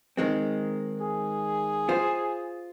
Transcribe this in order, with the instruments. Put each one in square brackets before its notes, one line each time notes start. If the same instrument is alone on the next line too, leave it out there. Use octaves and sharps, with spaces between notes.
[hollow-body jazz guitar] D#3 G#3 C4
[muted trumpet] G#4
[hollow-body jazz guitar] F4 C5